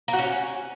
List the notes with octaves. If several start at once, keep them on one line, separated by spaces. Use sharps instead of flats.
A#3
F#4
C#4